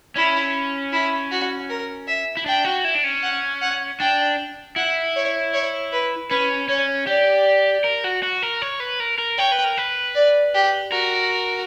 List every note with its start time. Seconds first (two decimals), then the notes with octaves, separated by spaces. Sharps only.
0.16 C#4 E4
0.92 E4
1.31 F#4
1.69 A#4
2.07 E5
2.37 E4
2.46 D4 G5
2.65 F#4
2.85 E4
2.95 D4
3.04 C#4
3.23 F#5
3.62 F#5
4.00 D4 G5
4.76 E4 F#5
5.16 C#5
5.54 C#5
5.92 B4
6.30 C#4 B4
6.69 C#4 C#5
7.07 G4 D5
7.84 A#4
8.04 F#4
8.23 F#4
8.43 A#4
8.62 C#5
8.80 B4
9.00 A#4
9.18 A#4
9.37 C#5 G5
9.52 B4
9.64 A#4
9.78 B4
10.15 D5
10.54 G4
10.91 F#4 A#4